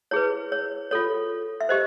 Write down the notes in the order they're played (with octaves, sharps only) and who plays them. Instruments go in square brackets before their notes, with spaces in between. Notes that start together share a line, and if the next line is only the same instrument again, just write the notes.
[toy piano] E4 G#4 B4 C#5
C#5
F4 A4 C#5
E5
G4 C5 D#5